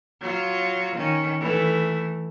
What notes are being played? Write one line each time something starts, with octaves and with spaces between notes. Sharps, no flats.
F#3 F4
D#3 C#4
E3 A3